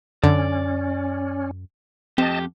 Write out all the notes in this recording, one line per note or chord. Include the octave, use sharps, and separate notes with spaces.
F#2 D3 C#4 D5
F2 C4 G4 D#5 A5